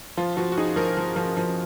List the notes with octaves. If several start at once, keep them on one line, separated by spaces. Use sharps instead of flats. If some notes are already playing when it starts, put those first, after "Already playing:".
F3 F4
F3 F#4
F#4
D#4 G#4
F3 A#4
F3
F3
F3